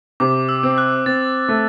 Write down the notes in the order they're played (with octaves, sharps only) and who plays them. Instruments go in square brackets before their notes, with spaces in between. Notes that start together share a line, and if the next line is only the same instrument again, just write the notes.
[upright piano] C3 [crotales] D6
[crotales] E6
[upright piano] C4
[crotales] F#6
[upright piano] C4 [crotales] A6
[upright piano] A3